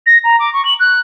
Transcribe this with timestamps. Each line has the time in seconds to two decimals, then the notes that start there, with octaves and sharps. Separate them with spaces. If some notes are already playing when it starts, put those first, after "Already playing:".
0.06 A#6
0.24 A#5
0.39 D6
0.53 C#6
0.65 F#7
0.79 F#6